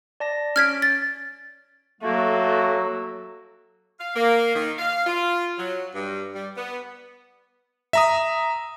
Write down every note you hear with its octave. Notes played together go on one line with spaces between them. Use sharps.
D5 A5 A#6
C#4 C#5 F6 G#6 B6 D7
A6
F#3 A3 A#3 F#4 A4
F5
A#3
D#3
F5
F4
F#3
G2
G3
B3
E5 A#5 D#6